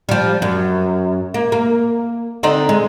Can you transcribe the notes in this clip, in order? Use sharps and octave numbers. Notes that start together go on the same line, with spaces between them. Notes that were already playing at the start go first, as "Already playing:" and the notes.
F3 G3
F#2
A#3
A#3
D3 C4 D#4
G#3